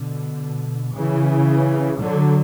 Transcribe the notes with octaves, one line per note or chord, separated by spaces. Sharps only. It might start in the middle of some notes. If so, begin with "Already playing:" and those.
Already playing: B2 D3
C#3 E3
D3 F#3